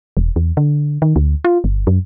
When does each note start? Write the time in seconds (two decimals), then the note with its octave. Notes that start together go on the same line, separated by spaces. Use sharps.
0.17 E1
0.36 E2
0.57 D3
1.02 D#3
1.16 D2
1.45 F4
1.64 G1
1.87 F#2